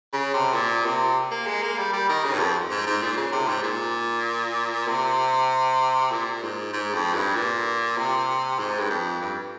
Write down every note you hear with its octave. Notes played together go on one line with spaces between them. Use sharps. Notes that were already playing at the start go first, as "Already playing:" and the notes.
C#3
C3
A#2
C3
A#3
G#3
A#3
G3
G3
D#3
C#3
G2
F2
G#2
G#2
A#2
C#3
C3
G#2
A#2
C3
A#2
G#2
G#2
F2
G2
A#2
C3
G#2
G2
F2
G2